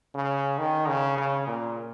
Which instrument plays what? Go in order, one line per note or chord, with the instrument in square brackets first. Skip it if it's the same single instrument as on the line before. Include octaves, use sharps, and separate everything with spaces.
[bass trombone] C#3
D#3
C#3
C#3
A#2